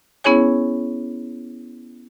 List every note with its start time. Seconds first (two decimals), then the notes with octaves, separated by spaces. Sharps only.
0.24 B3 C#4 E4 G#4 C#5 G#5